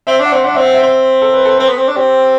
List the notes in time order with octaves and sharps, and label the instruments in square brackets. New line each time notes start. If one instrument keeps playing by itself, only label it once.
[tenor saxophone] C4 [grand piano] E5
[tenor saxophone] D4
[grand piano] F#5
[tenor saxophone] C4 [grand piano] C6
[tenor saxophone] D4 [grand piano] F#5
[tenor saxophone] C4 [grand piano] E5
[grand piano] F#5
E5
[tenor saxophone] C4
[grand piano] A4
B4
A4
[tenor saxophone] C4
B3
C4
D4
[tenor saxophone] C4 [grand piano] G4